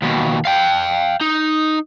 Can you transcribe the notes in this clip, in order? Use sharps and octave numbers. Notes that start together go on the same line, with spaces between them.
D#2 B2
F5 G5
D#4